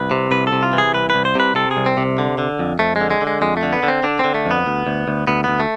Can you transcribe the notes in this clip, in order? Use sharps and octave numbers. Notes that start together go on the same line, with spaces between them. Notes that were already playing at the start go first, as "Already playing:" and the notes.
Already playing: C2 B4
C3
C2 B4
A4
C3
F4
E3
G#4
C2 B4
C2 B4
C5
C3 B4
C3 A4
G#4
C2
C4
C3
D3
D3
F2
F2 A3
G#3
D3
G#3
D3
G#3
F2 G#3
A3
D3
B3
D3
C4
D3 D4
D3 C4
A3
F2
B3
D2
D2
D2
D2 B3
D2 B3
A3